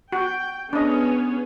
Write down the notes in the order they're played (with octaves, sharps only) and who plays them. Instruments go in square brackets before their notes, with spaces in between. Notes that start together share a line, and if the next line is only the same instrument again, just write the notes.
[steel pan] F#4 [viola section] G5
[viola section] B3 C#4 G#4 [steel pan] D4 D#5